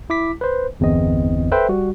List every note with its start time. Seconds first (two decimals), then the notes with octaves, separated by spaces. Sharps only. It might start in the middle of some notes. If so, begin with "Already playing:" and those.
0.10 E4 D6 B6
0.41 B4 C5
0.80 G1 E2 C4 D#5
1.51 A4 B4 C5 E5 G5
1.69 G3 F#4